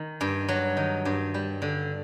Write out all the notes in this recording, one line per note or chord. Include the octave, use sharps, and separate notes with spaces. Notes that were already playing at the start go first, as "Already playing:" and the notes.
Already playing: D#3
G2
F#3
D#3
G2
G3
D3